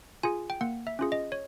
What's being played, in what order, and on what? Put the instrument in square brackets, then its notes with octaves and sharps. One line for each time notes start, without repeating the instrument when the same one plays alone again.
[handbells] F4 G#4 G#5
G5
A#3 F#5
E5
C#4 F4 G#4
D#5
C#5